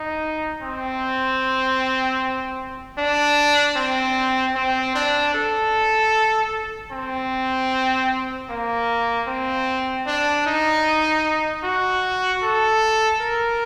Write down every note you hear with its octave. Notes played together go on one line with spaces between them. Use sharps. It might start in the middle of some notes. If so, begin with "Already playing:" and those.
Already playing: D#4
C4
D4
C4
C4
D4
A4
C4
A#3
C4
D4
D#4
F#4
A4
A#4